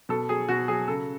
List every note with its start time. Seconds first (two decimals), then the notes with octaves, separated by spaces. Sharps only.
0.09 B2 A4
0.29 F#3 G#4
0.49 B2 F#4
0.68 F#3 G#4
0.88 C#3 A4